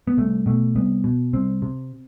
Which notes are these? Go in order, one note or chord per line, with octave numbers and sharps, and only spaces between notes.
B3
C2 A3
B2 A3
C2 B3
B2
C2 C4
C3